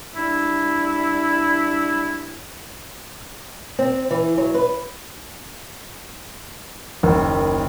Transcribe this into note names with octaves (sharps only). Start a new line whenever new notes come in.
G3 D4 E4
C4
E3
F#3
B4
F#1 D#2